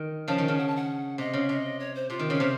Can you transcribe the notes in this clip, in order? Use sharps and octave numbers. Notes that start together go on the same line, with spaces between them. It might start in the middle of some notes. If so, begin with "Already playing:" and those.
Already playing: D#3
C#3 F3 A5
D#3
C#3
F#5
A5
F#5
C3 D#5
C#3
C3 D#5
C#5
C5
C3 F4
D#3
C#3 A#4
C3 C5